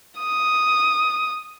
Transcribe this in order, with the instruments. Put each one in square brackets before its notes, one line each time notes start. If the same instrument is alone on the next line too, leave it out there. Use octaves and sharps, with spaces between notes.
[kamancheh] D#6